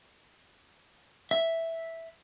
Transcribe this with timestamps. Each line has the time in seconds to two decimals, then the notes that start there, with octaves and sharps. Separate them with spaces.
1.31 E5